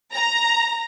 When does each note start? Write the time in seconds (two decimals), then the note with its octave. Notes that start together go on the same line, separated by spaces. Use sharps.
0.13 A#5